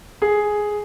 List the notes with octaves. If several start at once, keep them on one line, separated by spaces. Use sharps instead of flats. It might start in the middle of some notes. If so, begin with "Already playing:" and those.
G#4